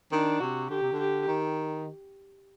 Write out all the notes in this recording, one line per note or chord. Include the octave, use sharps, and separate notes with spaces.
D#3 D4
C3 F#4
D3 G4
C3
D3
G4
D#3